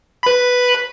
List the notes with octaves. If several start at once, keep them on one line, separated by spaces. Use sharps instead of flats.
B4 B5